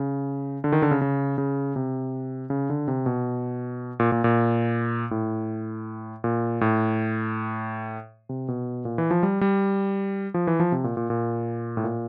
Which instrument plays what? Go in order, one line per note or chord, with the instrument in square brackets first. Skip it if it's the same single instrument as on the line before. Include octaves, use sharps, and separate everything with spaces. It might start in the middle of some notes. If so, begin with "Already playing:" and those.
Already playing: [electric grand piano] C#3
D3
D#3
D3
C#3
C#3
C#3
C3
C#3
D3
C3
B2
A#2
A#2
A#2
A2
A#2
A2
C3
B2
A#2
E3
F3
G3
G3
F3
E3
F3
C3
A#2
A#2
A#2
A2
A#2